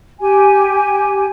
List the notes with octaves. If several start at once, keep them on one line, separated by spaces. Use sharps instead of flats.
G4 G#5